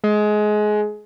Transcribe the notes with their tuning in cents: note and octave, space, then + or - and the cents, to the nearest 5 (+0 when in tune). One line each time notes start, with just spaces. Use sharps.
G#3 +20